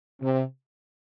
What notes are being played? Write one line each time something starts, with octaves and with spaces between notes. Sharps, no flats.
C3